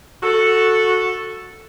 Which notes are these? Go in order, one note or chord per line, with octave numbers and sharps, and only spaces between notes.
F#4 A4